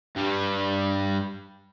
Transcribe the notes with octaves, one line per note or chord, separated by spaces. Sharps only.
G2 G3